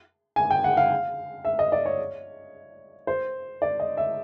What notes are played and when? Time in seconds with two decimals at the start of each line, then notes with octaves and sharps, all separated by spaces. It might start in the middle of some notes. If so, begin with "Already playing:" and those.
0.36 G#5
0.51 G5
0.64 F#5
0.77 F5
1.45 E5
1.59 D#5
1.72 D5
1.86 C#5
3.07 C5
3.62 D5
3.80 D#5
3.97 E5